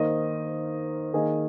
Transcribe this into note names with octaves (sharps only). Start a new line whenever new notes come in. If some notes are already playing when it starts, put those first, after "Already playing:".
Already playing: D#3 A#3 D#4 C5 D#5
D#3 A#3 G#4 D#5